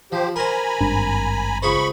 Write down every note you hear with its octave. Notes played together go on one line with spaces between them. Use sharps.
F3 G4 C5
A#4 C5 G#5 A#5 B5
G#1 G2 D4
C#2 G#4 C5 B5 C#6